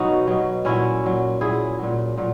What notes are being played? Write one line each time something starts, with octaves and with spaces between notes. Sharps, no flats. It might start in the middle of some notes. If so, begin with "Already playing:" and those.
Already playing: B2 F#3 D#4 F#4
B2 F#3
A#2 F#3 C#4 E4
A#2 F#3
A#2 F#3 E4 G#4
A#2 F#3
A#2 F#3